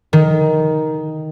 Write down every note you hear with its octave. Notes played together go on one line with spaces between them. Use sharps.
D#3